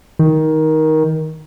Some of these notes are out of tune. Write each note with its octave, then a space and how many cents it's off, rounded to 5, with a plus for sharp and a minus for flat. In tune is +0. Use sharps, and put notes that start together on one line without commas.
D#3 +15